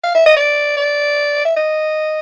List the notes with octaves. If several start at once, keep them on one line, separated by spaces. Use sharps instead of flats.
F5
E5
D#5
D5
D5
E5
D#5